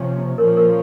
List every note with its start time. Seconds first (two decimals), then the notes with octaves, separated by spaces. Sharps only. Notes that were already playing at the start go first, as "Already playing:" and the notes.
Already playing: C3 F3 A#3 C#4
0.38 A#2 F3 A#3 C#4 A#4 C#5
0.57 A#4